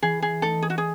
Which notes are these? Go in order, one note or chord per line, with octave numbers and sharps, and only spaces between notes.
E3 G#4
G#4
A3 D#4 A4
G#4
F#4
G#4